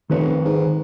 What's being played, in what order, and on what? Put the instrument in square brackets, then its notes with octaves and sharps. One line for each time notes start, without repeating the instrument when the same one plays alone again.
[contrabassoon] F1 [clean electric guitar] D#3 B4 C#5
[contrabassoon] G#2